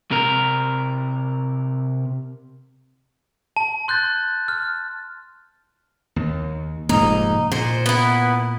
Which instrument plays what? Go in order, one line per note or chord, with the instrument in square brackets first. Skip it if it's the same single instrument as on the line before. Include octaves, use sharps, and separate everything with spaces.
[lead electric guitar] C3 A#4
[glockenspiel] A5
C6 F#6 G6 A6
F6
[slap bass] D#2
[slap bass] F1 G#2 A#3 [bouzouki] D#4
[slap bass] A#2 [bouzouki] C5
[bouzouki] B3 E4